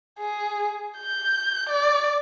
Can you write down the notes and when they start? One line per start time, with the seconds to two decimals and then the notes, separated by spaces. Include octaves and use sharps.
0.20 G#4
0.99 G6
1.69 D5